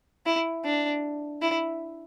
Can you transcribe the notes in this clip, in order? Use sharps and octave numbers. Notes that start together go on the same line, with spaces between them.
E4
D4
E4